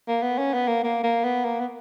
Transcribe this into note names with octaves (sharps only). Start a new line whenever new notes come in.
A#3
B3
C#4
B3
A#3
A#3
A#3
B3
A#3
B3